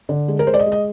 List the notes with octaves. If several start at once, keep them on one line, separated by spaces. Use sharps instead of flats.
D3
G#3
A#4
G#3 C5
D5
D#5
G#3
D#5